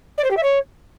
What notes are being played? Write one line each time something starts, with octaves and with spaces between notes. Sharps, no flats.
D5
C5
G4
E5
C#5